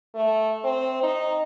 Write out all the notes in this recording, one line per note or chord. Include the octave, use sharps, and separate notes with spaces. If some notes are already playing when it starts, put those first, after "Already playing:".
A3
C4
D#4